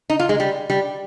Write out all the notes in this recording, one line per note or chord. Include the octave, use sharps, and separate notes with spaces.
D#4
F4
G#3
G3
G3